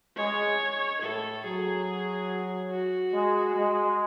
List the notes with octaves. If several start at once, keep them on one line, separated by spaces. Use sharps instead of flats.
G#3 C#5
A2 A4
F#3 G#4
F#4
G#3
G#3